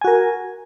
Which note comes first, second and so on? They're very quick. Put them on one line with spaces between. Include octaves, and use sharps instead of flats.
G#5 F#4 A#4